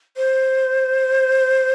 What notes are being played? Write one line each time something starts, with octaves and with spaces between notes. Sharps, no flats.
C5